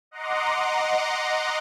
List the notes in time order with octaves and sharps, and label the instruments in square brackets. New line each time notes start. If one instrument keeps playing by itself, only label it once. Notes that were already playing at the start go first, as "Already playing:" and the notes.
[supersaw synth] D#5 F#5 A#5 C6 D6